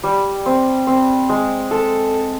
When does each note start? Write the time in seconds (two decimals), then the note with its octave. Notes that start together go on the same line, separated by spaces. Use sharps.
0.03 G3
0.46 C4
0.87 C4
1.29 G#3
1.71 A4